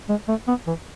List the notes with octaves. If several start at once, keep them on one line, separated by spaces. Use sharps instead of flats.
G#3
A3
B3
E3